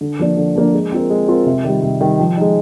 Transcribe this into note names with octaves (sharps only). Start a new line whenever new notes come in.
D3
F3 A#3 D4
D3
F3 A#3 D4
G#3
C4 F4 A#4
G#3
C4 F4 A#4
C3
D#3 G3
C3
D#3 G3
F3
G#3 D#4